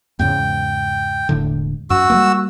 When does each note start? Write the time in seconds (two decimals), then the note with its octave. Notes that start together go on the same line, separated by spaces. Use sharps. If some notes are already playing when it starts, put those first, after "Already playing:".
0.19 E2 G#2 C#3 G5
1.29 E1 A2 D3
1.90 F#2 F#4 E6
2.10 G3 A3 A#3